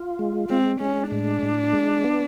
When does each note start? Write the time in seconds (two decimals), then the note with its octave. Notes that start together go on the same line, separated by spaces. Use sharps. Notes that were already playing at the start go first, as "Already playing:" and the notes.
Already playing: F4
0.19 G#3
0.50 G#3 C4
0.80 G#3 C#4
1.11 A2 D4
1.43 A2
1.73 G#3
2.04 B3